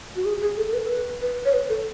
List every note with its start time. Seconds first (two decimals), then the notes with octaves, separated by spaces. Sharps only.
0.16 F#4
0.25 G#4
0.42 G#4
0.57 A4
0.67 A4
0.73 B4
0.84 A4
0.90 B4
1.21 B4
1.45 C#5
1.53 B4
1.69 A4